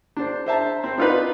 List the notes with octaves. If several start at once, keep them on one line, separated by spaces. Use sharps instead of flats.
D4 C5
C5 E5 A5 A#5
C4 C5
D4 D#4 F4 A#4 B4